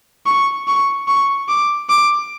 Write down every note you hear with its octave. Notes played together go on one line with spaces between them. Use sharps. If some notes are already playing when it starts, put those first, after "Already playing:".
C#6
C#6
C#6
D6
D6